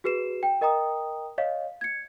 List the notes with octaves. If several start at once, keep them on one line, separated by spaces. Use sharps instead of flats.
F#4 G#4 B4 C7 E7
G5
A#4 D#5 G5 A#5 D#6
C#5 D#5 F5
G#6 C#7